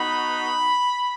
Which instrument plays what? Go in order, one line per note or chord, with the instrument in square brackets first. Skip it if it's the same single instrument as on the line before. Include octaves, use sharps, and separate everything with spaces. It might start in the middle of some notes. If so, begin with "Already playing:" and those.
Already playing: [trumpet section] B3 D#4 F#4 B5